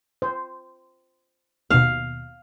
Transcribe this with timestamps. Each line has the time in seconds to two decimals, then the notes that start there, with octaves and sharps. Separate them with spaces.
0.22 C5
1.70 D#2 B2 F5